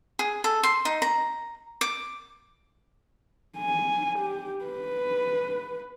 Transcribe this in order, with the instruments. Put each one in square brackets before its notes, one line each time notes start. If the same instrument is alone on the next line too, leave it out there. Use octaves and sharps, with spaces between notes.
[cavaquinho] G#4
A4
C6
D#4
A#5
D6
[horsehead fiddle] G#5
G4
B4